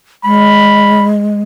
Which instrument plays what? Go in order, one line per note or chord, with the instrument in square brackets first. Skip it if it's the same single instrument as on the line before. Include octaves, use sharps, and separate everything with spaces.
[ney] G#3 [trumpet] B5